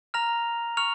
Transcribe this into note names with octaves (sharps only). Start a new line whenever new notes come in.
A#5 F6 A#6 F7
C#6 F6 C#7 F7